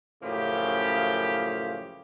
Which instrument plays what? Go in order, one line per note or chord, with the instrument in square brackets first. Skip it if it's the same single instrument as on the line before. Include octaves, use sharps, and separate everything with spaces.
[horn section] F#2 A2 C#3 F3 A#3 G4